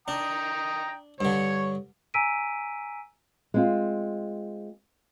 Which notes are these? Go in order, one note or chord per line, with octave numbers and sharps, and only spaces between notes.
D4 G5 A#5 D#6
G2 D3 C#5
G#5 A#5 E6 B6 D7 D#7
G#3 C4 F4